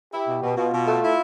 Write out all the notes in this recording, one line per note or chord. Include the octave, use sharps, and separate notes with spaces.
E4 G4
B2
B2
B2 F4
B2
A3
E4